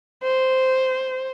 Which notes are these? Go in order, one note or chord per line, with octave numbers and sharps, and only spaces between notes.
C5